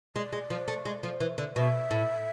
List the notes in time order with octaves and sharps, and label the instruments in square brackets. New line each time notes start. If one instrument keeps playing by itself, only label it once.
[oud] G#3 [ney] D5
[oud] G#3
F3
A3
G#3
F3
E3
D3
[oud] B2 [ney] E5
[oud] A2